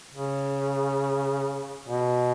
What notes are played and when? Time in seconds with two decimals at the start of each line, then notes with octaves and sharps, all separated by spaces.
0.14 C#3
1.89 B2